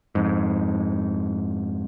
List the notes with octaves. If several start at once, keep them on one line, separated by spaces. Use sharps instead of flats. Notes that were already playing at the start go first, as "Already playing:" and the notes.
F2 G#2